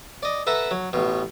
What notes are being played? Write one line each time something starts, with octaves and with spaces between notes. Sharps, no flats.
D5 D#5
A4 B4 E5 F#5 A#5
F#3
A1 B2